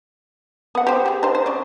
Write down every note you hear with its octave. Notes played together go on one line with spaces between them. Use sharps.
B3 F#5
G4 C5
G4 G#4
D#4 C5
C5
C#4 D5 D#5